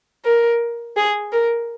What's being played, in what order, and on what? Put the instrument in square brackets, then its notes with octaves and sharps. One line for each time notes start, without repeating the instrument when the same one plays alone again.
[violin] A#4
G#4
A#4